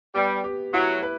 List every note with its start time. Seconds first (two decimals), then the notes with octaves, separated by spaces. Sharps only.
0.15 G3 B3
0.44 G4
0.74 F#3 E4
1.03 B4